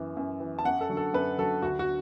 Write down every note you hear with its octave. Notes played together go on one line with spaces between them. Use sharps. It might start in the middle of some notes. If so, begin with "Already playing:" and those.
Already playing: F#2 E3
F#2
E3
A5
F#2 F#5
A4
D3 F#3
A4
F#2 B4
D3 F#3 A4
D2 F#4
F#4